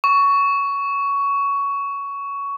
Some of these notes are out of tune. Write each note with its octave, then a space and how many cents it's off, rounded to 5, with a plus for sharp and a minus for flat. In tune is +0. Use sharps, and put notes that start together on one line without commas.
C#6 +15